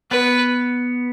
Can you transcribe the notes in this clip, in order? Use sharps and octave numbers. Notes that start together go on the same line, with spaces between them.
B3 B4